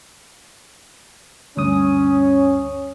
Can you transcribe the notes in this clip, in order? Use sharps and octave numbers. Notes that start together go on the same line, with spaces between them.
D2 G2 C#4 D#6